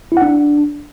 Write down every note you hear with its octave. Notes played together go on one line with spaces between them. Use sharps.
E4
F#5
D4